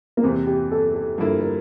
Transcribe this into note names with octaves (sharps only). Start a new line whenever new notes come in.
A#3
E2 C3 E3 C4
G4
A4
A4
G2 D3 F3 A#3 E4 A4
A#4